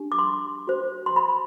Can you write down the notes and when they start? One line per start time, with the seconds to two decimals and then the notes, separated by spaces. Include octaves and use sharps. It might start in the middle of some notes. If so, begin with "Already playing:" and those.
Already playing: D4 G4
0.12 D6
0.19 C6
0.67 F#4 C5
1.06 C6
1.16 B5